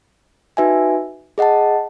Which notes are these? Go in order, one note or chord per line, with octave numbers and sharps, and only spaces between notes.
D#4 F#4 B4 E5 G#5
G#4 D#5 F#5 A5